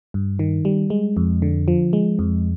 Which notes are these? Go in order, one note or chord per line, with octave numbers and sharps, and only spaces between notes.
G2
D#3
G3
G#3
F2
D3
F3
G#3
F2